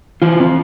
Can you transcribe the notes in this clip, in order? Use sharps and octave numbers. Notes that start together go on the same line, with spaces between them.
E3 F4
C4